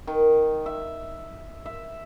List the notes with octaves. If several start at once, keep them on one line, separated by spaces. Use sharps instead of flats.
D#3
E5
E5